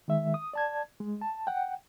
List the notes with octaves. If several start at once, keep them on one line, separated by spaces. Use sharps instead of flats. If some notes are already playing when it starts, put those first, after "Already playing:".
D#3 G#3 E5
D#6
D5 A5 G#6
G#3
A5
F#5 G5